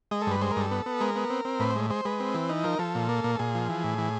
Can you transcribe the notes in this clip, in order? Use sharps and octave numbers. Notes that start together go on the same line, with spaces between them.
G#3 D#5
A4
G2 B4
G#3 C5
A#4
G2 A4
B3
B3
G#3 A#4
B3
C4
C4
A2 B4
C5
G#3
G#3 C5
G#3 B4
C4
E3
D#4
F3 A#4
F3 A4
A#2
A#3
A#2
A4
A#2 G#4
F3
E3
A2
E3